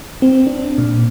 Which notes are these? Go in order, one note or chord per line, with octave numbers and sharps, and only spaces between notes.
C4
D4
A#2